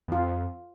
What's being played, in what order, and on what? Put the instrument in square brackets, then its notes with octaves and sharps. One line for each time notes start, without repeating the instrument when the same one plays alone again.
[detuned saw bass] E2
[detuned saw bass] F2 [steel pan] F4